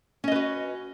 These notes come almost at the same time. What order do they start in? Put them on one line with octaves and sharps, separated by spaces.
C#4 D#5 B4 F#4